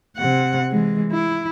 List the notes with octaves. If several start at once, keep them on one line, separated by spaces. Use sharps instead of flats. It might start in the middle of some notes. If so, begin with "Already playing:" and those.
C3 F#5
E3 G#3
E4